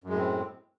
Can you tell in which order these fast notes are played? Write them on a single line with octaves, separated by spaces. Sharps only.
F#2 G#3 A2 C4